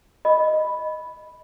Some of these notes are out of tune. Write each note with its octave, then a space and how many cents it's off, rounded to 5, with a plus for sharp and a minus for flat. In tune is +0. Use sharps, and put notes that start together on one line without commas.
D#5 +0 B5 +0